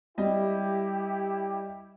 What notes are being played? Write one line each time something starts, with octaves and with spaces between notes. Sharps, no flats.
G3 E4 G4 D#5